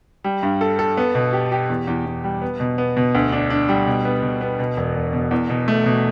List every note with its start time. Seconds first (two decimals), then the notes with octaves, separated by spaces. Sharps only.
0.24 G3
0.43 G2
0.61 A4
0.79 A4
0.97 B3
1.15 B2
1.33 G4
1.52 G4
1.69 E2
1.87 E2
2.06 E2
2.24 G3
2.42 B3
2.60 B2
2.78 B3
2.97 B2
3.15 D2
3.32 D4
3.50 D4
3.69 G3
3.87 B2
4.05 B3
4.23 B2
4.41 B3
4.59 B2
4.77 E1
4.95 E1
5.13 B2
5.31 E2
5.50 B2
5.68 A3
5.86 B2